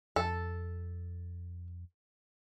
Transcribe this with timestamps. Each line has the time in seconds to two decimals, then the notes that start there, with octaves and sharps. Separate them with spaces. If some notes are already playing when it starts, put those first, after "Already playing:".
0.16 F2 A4